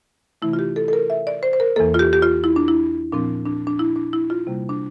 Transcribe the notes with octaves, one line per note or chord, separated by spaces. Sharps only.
C3 E3 A3 E4
F4
G4
A4
A4
A#4
E5
D5
C5
C5
A#4
E2 E3 A#3 A4
F4
G4
G4
F4
E4
D4
E4
A#2 F3 C4 D4
D4
D4
E4
D4
E4
F4
C3 G3 A#3
D4